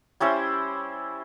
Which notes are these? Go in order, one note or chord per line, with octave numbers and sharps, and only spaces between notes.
G3 C#4 E4 C5